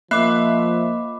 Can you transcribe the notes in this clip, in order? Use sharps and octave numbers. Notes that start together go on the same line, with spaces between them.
F3 A#3 D#5 E5 B5 D6 F#6 C7